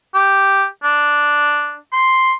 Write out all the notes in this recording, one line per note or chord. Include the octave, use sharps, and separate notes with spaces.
G4
D4
C6